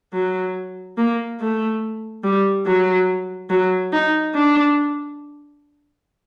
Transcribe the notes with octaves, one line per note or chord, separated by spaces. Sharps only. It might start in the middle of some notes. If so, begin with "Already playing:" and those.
F#3
A#3
A3
G3
F#3
F#3
D#4
D4